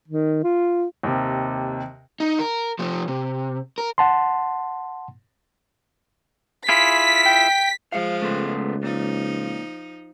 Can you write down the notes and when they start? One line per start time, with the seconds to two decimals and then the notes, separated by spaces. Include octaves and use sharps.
0.08 D#3
0.44 F4
1.03 D#2 C3
2.20 D#4
2.39 A#4
2.79 F3 A3
3.08 C3
3.78 A#4
3.98 F#5 A5 C6
6.69 E4 F4 G#4 B6
7.25 G5
7.92 F3 G#3 F5
8.22 C#2 A3 B3 C5
8.83 A#2 F3 D#4